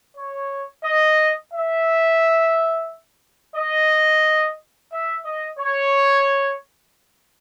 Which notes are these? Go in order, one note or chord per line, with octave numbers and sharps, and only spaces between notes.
C#5
D#5
E5
D#5
E5
D#5
C#5